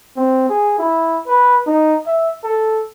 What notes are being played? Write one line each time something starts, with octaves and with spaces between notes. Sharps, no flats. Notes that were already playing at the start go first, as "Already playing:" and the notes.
C4
G#4
E4
B4
D#4
E5
A4